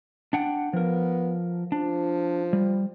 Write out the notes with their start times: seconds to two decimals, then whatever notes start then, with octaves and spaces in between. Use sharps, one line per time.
0.33 D4 F#5 G5
0.73 F3 B3 A#4
1.72 F3 D4
2.53 G3